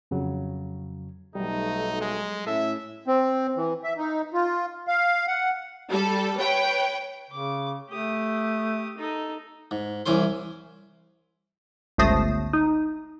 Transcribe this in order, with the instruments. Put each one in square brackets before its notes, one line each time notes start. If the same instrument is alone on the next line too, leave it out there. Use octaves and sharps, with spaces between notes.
[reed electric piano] F2 C#3 F#3
[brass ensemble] B1 A3 [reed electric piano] F#3 G3 [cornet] D#4
[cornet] G#3
[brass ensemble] A2 C#4 E4 [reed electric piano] A4 [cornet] E5
[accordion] C4
E3
E5
D#4
F4
F5
F#5
[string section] G3 A4
B4 C#5 G5
[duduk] C#3 [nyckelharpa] D6
[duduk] A3 [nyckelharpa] G4 D#6
[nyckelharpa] D#4 A4
[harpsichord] G#2
C2 E3 C#4 C5 C6
[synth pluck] G1 C#2 A3 C5 D#6 A#6
D#4